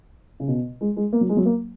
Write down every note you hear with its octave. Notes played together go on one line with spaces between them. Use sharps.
C#3
B2
G#3
G#3
A#3
F#3
G#3
F#3
A#3